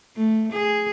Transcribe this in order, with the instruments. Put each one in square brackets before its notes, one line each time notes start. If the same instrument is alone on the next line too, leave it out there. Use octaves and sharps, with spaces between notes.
[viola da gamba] A3
G#4